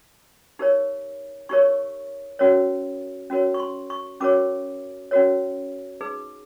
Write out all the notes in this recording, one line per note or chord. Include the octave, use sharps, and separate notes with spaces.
D#4 G4 A#4 C#5
D#4 G4 A#4 C#5 C#6
C#4 F#4 A#4 C#5
C#4 F#4 A#4 C#5
C#6
C6
C#6
C#4 F#4 A#4 C#5 D6
C#4 F#4 A#4 C#5
D#4 G#4 B4